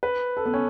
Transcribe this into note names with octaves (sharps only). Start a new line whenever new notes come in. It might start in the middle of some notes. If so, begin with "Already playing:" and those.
B4
A4
B3
C#4